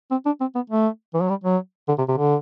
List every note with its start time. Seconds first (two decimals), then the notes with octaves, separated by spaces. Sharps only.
0.11 C4
0.26 D4
0.40 C4
0.55 B3
0.70 A3
1.14 E3
1.22 F#3
1.29 G3
1.44 F#3
1.88 D3
1.98 C3
2.08 C3
2.18 D3